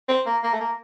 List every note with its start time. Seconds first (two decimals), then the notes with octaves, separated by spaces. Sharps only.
0.09 C4
0.26 A#3
0.44 A#3
0.54 A3
0.60 A#3